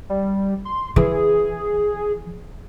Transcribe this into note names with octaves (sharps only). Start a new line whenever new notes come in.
G3
C6
E3 G#4